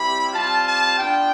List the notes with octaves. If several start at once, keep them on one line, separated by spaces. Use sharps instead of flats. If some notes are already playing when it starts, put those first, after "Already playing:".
Already playing: G3 C4 E4 G4 B5
G3 C4 F4 A5
A5
B3 D4 F4 G5